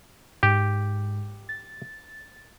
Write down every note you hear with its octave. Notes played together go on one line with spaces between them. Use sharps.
G#2 G4
A6